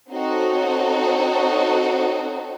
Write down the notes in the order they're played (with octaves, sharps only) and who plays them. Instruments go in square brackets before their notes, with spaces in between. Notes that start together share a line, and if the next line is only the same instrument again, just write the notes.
[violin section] C4 D#4 F#4 A4 C#5